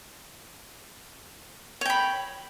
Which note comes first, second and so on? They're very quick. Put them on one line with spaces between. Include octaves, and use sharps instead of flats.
C#5 G5 B5